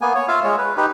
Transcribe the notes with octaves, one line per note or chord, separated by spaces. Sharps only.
A#3 B3 G#5
C#5
F4 E5 F5
G#3 C#5
B4
D#4 G4 B4